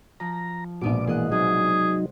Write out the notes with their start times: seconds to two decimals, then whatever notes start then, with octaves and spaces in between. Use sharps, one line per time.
0.20 F3 A#5
0.81 A#1 G#2 B2 B3 D5 D6
1.08 E3 A#3 G#4 D#5 F#5
1.32 C3 F#3 D#4 G#4